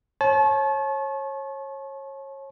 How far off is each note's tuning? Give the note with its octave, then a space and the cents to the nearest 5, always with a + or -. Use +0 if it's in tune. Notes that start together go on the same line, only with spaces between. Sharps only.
C#5 -30 A5 -35